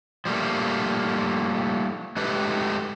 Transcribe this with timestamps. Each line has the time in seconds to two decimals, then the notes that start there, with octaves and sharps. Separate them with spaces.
0.25 F3 G3 A3 A#3
2.17 G#3 A3 G4 B4